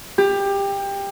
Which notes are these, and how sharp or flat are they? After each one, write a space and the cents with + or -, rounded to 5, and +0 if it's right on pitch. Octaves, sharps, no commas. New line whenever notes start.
G4 +20